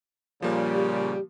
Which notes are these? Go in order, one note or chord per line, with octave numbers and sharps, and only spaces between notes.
A#2 C#3 F3 G3 A#3
G4